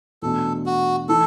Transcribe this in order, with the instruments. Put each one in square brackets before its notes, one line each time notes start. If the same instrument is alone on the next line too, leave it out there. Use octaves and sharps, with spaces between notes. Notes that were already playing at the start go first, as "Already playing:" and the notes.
[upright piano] E2 B2 A3 D4 [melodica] A4
[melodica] F#4
[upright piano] E3 A3 E4 [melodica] A4